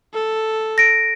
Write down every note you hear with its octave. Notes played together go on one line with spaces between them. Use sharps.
A4
A#6 D7